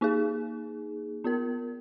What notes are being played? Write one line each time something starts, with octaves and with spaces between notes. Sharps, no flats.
A#3 D#4 G#4
B3 F4 A#4